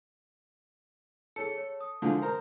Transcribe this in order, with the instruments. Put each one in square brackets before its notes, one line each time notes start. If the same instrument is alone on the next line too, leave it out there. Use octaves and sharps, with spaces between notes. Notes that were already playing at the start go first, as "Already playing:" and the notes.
[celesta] G#4 C#5 C#7 [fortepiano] A4
[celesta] C#5
D#6
[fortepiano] D3 F3 G#3
A#4 C5 A#5